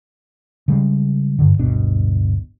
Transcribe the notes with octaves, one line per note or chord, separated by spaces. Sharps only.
C#3 G3 G#3
G2 D3
D1 G1 B2 D4